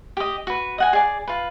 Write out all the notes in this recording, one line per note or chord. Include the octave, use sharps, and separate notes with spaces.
G4 D#5
F#4 B4
D#5 F#5 G#5
G#4 D5
F4 B4